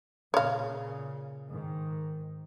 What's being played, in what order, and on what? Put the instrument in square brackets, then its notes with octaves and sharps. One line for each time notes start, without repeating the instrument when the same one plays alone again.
[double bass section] A#2 C#3 [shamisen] C#5 F5
[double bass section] G#2 D#3